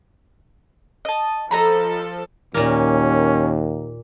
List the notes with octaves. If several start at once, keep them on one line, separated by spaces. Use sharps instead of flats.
D#5 A5
F3 A4 D#5 A#5 B5
D#2 A#2 A#3 C#4